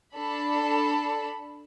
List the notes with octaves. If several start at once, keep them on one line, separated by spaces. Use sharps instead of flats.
D4 A4 B5